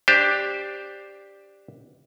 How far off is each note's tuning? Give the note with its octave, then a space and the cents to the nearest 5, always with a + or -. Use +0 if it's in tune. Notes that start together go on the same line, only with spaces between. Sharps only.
D4 +0 G4 +10 C5 +0